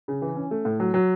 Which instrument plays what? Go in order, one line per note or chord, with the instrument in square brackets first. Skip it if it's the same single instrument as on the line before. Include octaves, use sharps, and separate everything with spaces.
[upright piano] C#3
E3
C#4
A3
A2
F#3
F#3